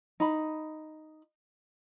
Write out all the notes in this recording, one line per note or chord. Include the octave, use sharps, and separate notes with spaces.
D#4 B5